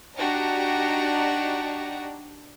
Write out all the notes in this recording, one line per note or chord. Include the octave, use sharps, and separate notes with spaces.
D4 D#4 F#4 G4 D5 A#5